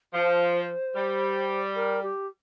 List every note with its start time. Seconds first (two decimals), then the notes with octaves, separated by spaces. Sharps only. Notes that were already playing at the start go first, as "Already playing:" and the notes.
0.14 F3 C5
0.96 G3
1.75 A#4
2.02 G4